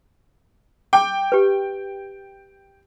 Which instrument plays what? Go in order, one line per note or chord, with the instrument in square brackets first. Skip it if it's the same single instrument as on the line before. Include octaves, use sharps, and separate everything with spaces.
[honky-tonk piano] G5 [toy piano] D6
[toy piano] G4 B4